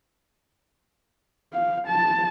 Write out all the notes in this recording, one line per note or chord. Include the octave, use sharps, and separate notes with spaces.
F5
A5